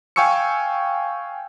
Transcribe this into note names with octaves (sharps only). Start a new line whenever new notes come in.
F5 G5 G#5 C#6 E6 C#7